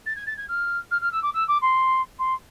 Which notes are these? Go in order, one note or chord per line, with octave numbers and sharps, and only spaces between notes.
A6
G#6
A6
G#6
F6
F6
F6
E6
D6
E6
D6
C6
C6